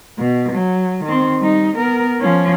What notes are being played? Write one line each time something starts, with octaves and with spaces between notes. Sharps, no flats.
B2
F#3
D#3 C4
G3 D#4
B3 A#4
F3 C#4